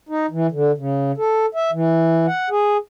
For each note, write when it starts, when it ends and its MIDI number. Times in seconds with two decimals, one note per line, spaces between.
0.09 0.26 63
0.31 0.47 52
0.52 0.72 50
0.78 1.12 49
1.18 1.46 69
1.55 1.71 76
1.72 2.26 52
2.27 2.49 78
2.50 2.77 68